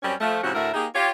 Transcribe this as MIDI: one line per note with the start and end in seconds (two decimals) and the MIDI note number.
0.03 0.14 42
0.03 0.14 55
0.03 0.14 60
0.03 0.14 61
0.20 0.39 53
0.20 0.39 57
0.43 0.50 44
0.43 0.50 48
0.43 0.50 53
0.43 0.50 61
0.43 0.50 64
0.43 0.50 66
0.55 0.69 38
0.55 0.69 45
0.55 0.69 66
0.55 0.69 70
0.55 0.69 76
0.74 0.86 58
0.74 0.86 63
0.74 0.86 67
0.74 0.86 68
0.94 1.08 65
0.94 1.08 67
0.94 1.08 73